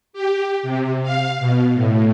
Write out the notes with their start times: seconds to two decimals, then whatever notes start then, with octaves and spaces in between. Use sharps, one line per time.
0.13 G4
0.63 C3
1.03 F5
1.40 B2
1.74 A2